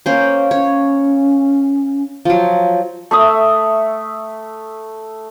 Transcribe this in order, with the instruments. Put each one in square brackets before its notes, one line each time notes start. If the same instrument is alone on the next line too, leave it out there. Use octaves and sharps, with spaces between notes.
[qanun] A#3 C#4 C5
[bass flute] C#4 [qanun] C#5
[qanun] F3 F#3
[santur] A3 E5 D#6